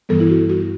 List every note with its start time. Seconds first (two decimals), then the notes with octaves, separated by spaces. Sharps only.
0.09 G2 E3 G3 B3 A4
0.20 E4
0.30 F#4
0.49 F#4